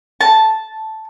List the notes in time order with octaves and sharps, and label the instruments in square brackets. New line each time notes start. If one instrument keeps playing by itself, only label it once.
[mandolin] A5